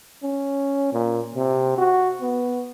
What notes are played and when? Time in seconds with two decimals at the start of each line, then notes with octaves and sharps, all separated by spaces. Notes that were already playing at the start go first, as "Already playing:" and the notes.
0.23 C#4
0.93 A#2
1.36 C3
1.78 F#4
2.21 B3